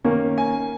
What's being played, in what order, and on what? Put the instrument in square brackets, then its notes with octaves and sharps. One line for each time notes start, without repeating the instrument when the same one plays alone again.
[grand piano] D#3 A#3 C#4
G#5